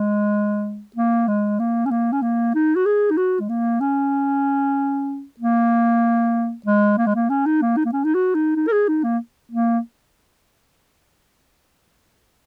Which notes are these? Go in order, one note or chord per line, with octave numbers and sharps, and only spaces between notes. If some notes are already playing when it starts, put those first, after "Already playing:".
Already playing: G#3
A#3
G#3
A#3
C#4
A#3
C#4
A#3
D#4
F#4
G#4
D#4
F#4
G#3
A#3
C#4
A#3
G#3
A#3
G#3
A#3
C#4
D#4
A#3
D#4
A#3
C#4
D#4
F#4
D#4
D#4
A#4
G#4
D#4
A#3
A#3